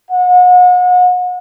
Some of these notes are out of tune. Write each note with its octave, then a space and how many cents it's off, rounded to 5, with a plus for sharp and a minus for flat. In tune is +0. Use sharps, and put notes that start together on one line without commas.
F#5 -40